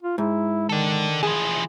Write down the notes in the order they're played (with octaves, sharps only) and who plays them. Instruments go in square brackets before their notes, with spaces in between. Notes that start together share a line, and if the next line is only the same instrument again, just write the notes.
[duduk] F4
[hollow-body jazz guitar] G#2 [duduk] E4
[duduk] D#3 [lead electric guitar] A4 D5
[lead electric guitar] E3 F3 [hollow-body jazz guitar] G#4